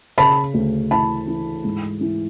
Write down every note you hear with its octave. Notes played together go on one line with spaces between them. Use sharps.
C#3 A5 B5
D2
E3 A5 B5
E3
G#2
E3